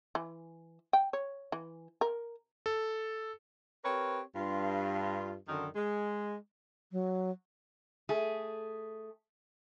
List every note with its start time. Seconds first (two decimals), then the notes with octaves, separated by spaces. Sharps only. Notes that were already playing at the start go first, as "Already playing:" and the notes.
0.15 E3
0.93 G5
1.13 C#5
1.52 E3
2.01 A#4
2.66 A4
3.84 C4 G4 A#4 B4 C#5
4.35 G2 F4
5.47 F#2 D3 D#3
5.76 G#3
6.92 F#3
8.09 A3 G#4